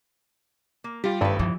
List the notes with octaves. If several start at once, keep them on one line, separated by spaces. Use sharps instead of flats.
A#3
G3 F4 G4
G#1 G2 A3 B4 B5
E3 F3